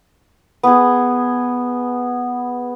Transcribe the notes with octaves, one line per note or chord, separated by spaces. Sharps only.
B3 G#4